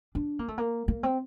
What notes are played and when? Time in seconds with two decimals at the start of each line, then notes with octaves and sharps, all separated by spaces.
0.15 D4
0.39 A#3
0.48 A3
0.58 A#3
0.88 A#3
1.03 C4